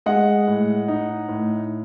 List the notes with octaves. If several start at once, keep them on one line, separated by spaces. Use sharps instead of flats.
G#3 D#5 F#5
A2
D#4
A2